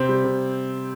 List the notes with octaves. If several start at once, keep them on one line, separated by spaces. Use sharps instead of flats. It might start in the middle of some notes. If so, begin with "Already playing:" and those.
Already playing: C3 C4
G3
C3